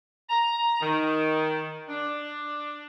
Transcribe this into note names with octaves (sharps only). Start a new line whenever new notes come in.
A#5
D#3
D4